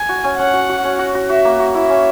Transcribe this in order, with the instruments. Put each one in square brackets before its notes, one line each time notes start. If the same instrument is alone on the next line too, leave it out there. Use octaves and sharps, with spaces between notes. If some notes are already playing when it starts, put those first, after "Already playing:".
Already playing: [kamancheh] G#5
[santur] F#4
C#4
[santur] C#4 [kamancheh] F#5
[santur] F#4
F#4
C#4
F#4
F#4
[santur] F#4 [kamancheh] E5
[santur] A#3
F#4
[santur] E4 [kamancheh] E5
[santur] C#4